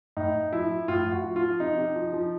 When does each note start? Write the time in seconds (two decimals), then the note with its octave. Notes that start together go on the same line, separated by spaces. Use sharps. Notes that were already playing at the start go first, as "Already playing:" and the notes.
0.17 A2 D#4
0.35 A2
0.53 F3 E4
0.71 F3
0.88 A2 F4
1.06 A2
1.12 F#4
1.24 F3
1.36 F4
1.42 F3
1.60 C3 D#4
1.78 C3
1.96 F3
2.14 F3